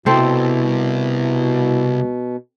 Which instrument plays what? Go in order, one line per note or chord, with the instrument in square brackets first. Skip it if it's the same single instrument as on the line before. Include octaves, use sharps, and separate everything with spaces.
[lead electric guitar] C2 [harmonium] B2 [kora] C4 A4 C5 [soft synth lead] E4